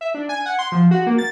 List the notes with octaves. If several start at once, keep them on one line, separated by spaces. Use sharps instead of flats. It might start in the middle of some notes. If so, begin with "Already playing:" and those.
E5
D4
G#5
F#5
C6
F3
F#4
A#3
A6